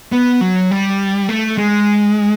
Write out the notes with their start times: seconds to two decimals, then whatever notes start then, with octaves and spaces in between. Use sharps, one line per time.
0.12 B3
0.41 F#3
0.71 G3
1.29 A3
1.58 G#3